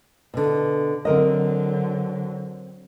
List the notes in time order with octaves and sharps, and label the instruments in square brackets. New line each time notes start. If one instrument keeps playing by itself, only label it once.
[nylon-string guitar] B2 D3
[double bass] D3 F#3 [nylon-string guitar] C4 A#4 D#5